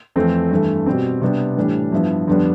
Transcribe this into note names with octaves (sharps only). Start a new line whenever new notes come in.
F2 E3 A3 C4
G2 E3 A3
B2 G3 C4
C3 G3 B3 D4
A2 E3 G3 D4
G2 F3 B3 E4
F2 D3 G3 B3 D4